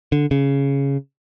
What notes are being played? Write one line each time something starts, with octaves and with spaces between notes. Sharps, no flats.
D3
C#3